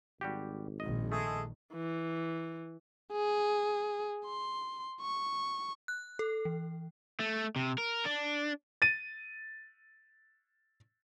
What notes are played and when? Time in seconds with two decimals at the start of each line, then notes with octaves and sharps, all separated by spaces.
0.21 G#1 G3 F#4 G4
0.80 A#1 D#3 D#5
1.12 G#3 A3 G#4 A4
1.73 E3
3.12 G#4
4.26 C6
5.01 C#6
5.88 F#6
6.19 A4
6.45 E3
7.20 A3
7.56 C3
7.78 A#4
8.05 D4
8.82 A6 D#7